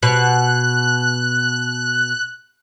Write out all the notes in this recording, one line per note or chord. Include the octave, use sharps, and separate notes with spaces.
B2 F#6